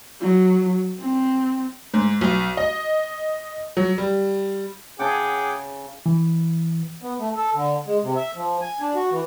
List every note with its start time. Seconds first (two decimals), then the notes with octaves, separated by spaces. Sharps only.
0.21 F#3
1.00 C4
1.94 G#2
2.21 B1
2.57 D#5
3.77 F#3
3.98 G3
4.99 C#3 G#4 F#5 G5 A5 D6
6.06 E3
7.02 B3
7.19 A3
7.36 A4
7.55 D3
7.87 G#3
8.03 C3
8.16 E5
8.36 F3
8.61 G#5
8.81 D4
8.95 F#4
9.11 E3